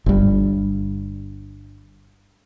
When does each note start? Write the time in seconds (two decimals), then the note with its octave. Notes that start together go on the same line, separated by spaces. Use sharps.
0.06 G1 G2